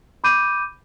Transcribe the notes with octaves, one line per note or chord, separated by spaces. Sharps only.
B5 D6 G6 D#7